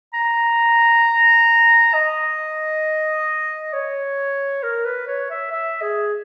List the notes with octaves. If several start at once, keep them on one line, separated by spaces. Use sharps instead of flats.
A#5
D#5
C#5
A#4
B4
C#5
E5
E5
G#4